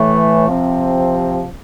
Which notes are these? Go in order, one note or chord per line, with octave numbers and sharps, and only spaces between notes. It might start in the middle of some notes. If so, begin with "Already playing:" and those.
Already playing: A2 E3 A3
C3 F3 C4